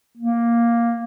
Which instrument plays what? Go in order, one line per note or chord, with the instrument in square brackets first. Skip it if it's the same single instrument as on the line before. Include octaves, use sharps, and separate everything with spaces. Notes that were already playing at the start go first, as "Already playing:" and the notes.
[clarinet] A#3